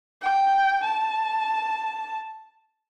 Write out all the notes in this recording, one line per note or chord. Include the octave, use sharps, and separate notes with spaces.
G5
A5